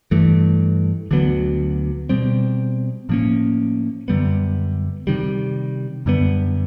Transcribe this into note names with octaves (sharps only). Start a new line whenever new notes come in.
G2 E3 A3
D2 D3 F#3 B3
B2 G3 C4
A2 F3 A#3 C#4
F#2 D3 G3 B3
C3 D#3 G3
F#2 D3 G3 B3